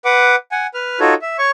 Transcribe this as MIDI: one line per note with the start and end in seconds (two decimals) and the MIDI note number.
0.05 0.36 71
0.05 0.36 78
0.05 0.36 86
0.52 0.67 78
0.52 0.67 80
0.74 1.00 71
0.74 1.00 89
1.00 1.14 63
1.00 1.14 65
1.00 1.14 66
1.00 1.14 69
1.00 1.14 73
1.22 1.37 76
1.39 1.51 73
1.39 1.51 85